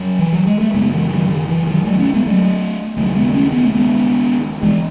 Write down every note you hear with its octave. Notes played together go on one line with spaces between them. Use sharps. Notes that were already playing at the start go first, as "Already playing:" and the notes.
Already playing: F#2 C#3 F#3
E3
F#3
G#3
A3
F#2 C#3 G#3 B3
E3
D#3 F#3
D#3
E3
D#3 F#3
F#3 A3
A3 C#4
G#3 B3
F#3 A3
D#2 C#3 F#3 A3
G#3 B3
A3 C#4
B3
A3
G#3 B3
E3 G#3